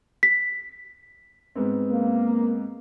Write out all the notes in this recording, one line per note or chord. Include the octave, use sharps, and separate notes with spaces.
B6
G#2 B3 C4
A#3